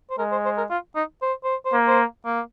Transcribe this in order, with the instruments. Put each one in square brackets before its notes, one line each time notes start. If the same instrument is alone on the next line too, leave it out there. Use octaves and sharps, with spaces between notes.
[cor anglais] C5
[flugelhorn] G#3 [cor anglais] A#4
[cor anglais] C5
C5
A#4
F4
D#4
C5
C5
C5
[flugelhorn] A#3
[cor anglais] C5
A#3